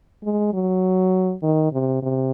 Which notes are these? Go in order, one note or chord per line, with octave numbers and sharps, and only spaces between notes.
G#3
F#3
D#3
C3
C3